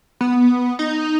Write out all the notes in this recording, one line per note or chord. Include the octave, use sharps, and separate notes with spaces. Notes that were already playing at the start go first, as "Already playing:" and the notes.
B3
D#4